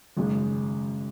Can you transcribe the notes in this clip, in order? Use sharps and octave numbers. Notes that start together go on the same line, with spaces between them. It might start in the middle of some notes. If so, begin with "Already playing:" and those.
G#1 F#2 C#3 G#3